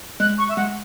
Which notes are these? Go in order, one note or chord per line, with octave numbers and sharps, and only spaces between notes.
G#3 F#6
C#6
E5
G#3 F#5